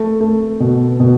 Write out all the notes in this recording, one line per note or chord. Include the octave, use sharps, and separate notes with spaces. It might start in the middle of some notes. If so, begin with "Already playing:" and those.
Already playing: A3
A3
B2
B2